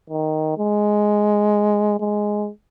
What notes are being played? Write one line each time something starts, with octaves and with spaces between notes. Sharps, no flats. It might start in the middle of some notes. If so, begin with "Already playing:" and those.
D#3
G#3
G#3